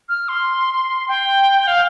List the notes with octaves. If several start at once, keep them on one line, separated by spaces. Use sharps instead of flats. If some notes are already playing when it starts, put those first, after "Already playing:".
F6
C6
G5
F5